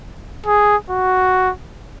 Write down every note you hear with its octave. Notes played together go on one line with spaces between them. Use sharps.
G#4
F#4